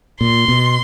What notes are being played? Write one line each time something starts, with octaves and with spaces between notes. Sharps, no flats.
A#2 C6
B2